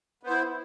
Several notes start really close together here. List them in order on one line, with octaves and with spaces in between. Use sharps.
B3 C5 E4